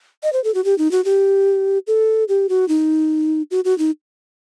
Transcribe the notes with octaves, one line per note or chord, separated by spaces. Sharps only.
D#5
C5
A4
F#4
G4
D#4
F#4
G4
A4
G4
F#4
D#4
F#4
F#4
D#4